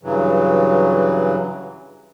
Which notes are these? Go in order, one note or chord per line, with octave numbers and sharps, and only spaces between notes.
G2 C#3 E3 F#3